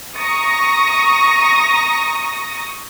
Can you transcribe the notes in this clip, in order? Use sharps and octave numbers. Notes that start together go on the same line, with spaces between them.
A#5 C#6 D#6 A#6